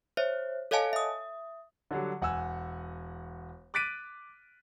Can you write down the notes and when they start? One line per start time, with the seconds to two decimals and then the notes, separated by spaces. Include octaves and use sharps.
0.17 C5 C#5 E5
0.71 A4 C#5 D#5 F5 G#5 A5
0.93 E5 D#6
1.91 D3 F#3 G3
2.21 E1 F#5 G#5 E6
3.74 D6 F#6 A6 B6 D7 D#7